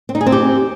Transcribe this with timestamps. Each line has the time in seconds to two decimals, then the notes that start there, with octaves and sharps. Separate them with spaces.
0.09 C4
0.15 D#4
0.21 G#4
0.27 C4
0.32 G4